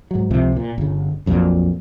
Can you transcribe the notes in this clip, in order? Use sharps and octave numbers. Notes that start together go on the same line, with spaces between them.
G#2 F#3
C#2 C3 F3
A#2
G1 C#3
A#1 F2 A#2 F#3